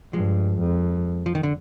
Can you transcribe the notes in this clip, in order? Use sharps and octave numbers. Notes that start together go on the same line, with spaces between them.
G2 F3 G#3
F2
F3
D#3
D3